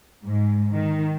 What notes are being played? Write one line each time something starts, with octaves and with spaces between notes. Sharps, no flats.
G#2
D#3